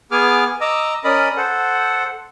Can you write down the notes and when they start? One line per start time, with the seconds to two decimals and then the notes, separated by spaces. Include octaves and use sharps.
0.11 B3 G#4 G#5 D6 F6
0.61 D#5 A#5 D6 E6
1.04 C#4 A#4 D5 D#5 B5 D#6
1.37 A4 C5 F#5